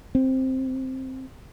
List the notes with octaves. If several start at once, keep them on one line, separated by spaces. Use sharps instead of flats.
C4